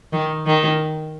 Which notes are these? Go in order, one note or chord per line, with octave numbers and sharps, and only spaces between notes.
D#3
D#3